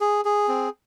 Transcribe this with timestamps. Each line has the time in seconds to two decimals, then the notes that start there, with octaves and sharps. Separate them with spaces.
0.01 G#4
0.25 G#4
0.48 C4